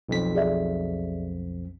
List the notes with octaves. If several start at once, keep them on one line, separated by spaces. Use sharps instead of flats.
B1 F2 B6
G#4 D5 E5